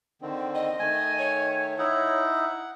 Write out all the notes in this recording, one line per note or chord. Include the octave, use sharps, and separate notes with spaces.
D3 D#3 C4
D#5
D#3 A3 G#5
C#5
D#4 E4 F#5